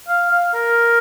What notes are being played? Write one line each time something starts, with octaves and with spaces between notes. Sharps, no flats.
F5
F5
A#4